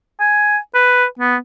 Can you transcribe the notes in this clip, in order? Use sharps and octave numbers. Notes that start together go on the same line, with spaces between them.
G#5
B4
B3